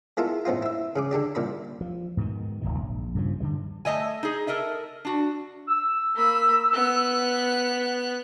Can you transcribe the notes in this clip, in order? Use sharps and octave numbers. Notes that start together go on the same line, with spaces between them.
G#3 B3 E4 F4 A4 A#4
A2 B3 C4 D#4 F4
E4 E5
C#3 G#4 D6
D3 D4 G4 D5
C2 A#2 D5 B5
F3
G#2 B2 D3 D#3
D1 B1 A#2 D#3
A#1
G2 C#3 F3
D3 D#3 G3
A3 A#3 D#5 E5 G#5
D#4 G#4
A4 A#4 D#5 E5
D4 F#4
E6
A#3 B5
B3 F#6